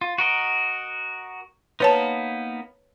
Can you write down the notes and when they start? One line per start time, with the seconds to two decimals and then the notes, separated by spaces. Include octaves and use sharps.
0.01 F4
0.18 F#4 A#4 D#5
1.80 A#3 B3 D#4 B4 C#5 A5